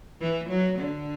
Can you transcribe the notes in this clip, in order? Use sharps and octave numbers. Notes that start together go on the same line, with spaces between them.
E3
F#3
D3